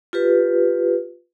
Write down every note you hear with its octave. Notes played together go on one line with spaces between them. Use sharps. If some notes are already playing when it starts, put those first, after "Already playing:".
F4 G4 B4